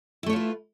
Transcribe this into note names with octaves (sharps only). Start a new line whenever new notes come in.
A3 E4 F4 B4 C#5